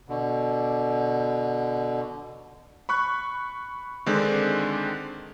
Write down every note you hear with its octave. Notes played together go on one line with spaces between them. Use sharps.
B2 D3
B5 C#6 F#6
D3 D#3 G#3 C4 D4